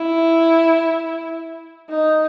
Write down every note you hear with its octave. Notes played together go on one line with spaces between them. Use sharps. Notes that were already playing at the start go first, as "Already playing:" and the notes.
Already playing: E4
D#4